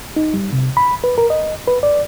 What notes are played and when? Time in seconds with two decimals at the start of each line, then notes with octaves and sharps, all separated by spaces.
0.16 D#4
0.34 G3
0.53 C3
0.77 B5
1.04 B4
1.18 A#4
1.30 D#5
1.68 B4
1.83 D5